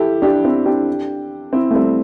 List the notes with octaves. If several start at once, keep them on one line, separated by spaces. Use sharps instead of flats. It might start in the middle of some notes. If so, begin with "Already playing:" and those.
Already playing: E4 G4 A4
D4 G4
C4 E4
D4 G4
C4 E4
A3
G3 C4